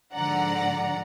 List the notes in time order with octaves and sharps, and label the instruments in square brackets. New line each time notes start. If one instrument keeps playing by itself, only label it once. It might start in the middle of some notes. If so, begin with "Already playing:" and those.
[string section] G#2 D3 F3 D5 F#5 A#5